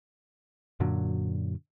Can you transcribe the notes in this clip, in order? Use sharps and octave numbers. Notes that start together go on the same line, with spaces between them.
F#2 A#2 D3 F#3